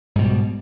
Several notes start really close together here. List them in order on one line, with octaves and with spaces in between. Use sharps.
G#2 B2 G3